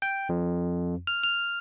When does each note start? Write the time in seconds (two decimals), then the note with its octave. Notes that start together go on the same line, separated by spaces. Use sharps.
0.02 G5
0.29 F2
1.07 F6
1.23 F6